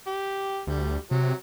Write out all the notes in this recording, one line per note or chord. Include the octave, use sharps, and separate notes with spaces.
G4
D2 G3
C3 F#3